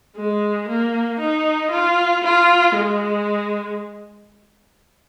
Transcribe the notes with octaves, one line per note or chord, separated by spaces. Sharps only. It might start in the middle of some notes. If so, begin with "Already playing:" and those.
G#3
A#3
D#4
F4
F4
G#3